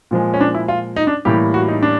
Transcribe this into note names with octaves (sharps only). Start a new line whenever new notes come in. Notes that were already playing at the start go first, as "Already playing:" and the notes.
A#2 F3 G#3
C#4
D4
E4
F4
D#4
D4
A2 E3 G3 A#3 G4
F#4
D#4
D4